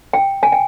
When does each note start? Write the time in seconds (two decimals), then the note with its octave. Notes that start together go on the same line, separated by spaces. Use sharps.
0.13 G5
0.43 G#5
0.52 G5